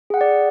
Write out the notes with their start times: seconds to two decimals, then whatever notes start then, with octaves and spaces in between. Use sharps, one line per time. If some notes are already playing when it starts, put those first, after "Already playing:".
0.10 G#4
0.14 F#5
0.17 G5
0.21 D5